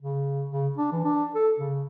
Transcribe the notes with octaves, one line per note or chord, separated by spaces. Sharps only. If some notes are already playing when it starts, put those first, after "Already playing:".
C#3
C#3
D4
E3
D4
A4
C#3